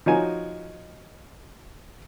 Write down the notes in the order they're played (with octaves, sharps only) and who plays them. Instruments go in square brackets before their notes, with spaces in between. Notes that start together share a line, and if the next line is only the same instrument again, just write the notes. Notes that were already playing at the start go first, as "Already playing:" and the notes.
[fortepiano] F3 D#4 F#4 C#5 G#5